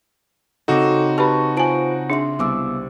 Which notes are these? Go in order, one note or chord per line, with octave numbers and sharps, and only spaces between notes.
C#3 C4 D#4 F#4 A4 D6 E7
G4 B4 A5 B5 C#6
F4 C5 G#5 A5 D7
D4 G#4 E5 C6
C2 B3 D6 E6